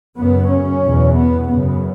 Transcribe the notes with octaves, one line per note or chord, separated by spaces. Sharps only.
F#2 C#3 B3
C#4
E2 B2
B3
F#2 C#3 B3